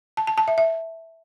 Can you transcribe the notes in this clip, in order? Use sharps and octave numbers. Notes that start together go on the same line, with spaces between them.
A5
A5
A5
E5
E5